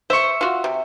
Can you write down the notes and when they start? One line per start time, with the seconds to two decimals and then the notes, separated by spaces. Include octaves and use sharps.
0.10 C5 E5 C#6
0.41 F4 F#4
0.64 C3